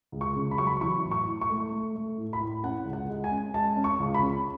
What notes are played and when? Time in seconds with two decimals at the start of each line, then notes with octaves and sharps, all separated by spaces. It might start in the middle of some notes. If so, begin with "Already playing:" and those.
0.12 C#2
0.21 C#6
0.36 C#3
0.51 B5
0.58 F#3 C#6
0.67 B5
0.81 E3 C#6
1.05 A2
1.11 C#6
1.27 A2
1.41 C#6
1.50 A3
1.72 A3
1.96 A3
2.17 A2
2.33 B5
2.40 A2
2.63 C#4 F#5
2.85 C#2
2.93 F#5
3.09 G#3
3.24 G#5
3.31 C#4
3.54 G#3 A5
3.77 C#4
3.84 C#6
4.00 C#2
4.14 B5
4.22 C#4